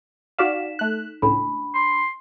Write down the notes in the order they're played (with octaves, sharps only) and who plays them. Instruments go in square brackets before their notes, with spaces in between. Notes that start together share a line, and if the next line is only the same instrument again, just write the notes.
[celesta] D#4 B6 E7 [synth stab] F#4 D5 F5
[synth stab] A3 F#6
[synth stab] C#2 A2 [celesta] D4 B5
[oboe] C6